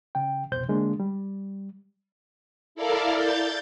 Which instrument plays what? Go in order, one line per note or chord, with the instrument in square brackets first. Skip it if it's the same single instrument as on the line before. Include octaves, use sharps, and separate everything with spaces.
[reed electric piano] C#3 G5
C2 F2 B2 C5 G6
D3 G#3 A#3 D4
G3
[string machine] E4 A4 A#4 D5 F5
G6 A6